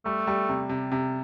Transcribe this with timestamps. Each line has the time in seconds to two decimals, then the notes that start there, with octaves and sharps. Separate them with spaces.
0.05 G3 A3
0.27 G3
0.49 C3
0.70 C3
0.92 C3